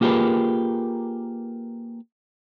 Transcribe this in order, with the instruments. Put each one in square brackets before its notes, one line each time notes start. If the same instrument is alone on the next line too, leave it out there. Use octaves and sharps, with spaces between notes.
[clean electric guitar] A#3 F4 G4 G#4 A#4 B4